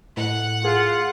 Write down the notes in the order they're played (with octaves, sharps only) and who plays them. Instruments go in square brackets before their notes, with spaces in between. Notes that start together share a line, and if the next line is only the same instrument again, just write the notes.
[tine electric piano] A2 [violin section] F#5
[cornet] F4 [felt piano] G#4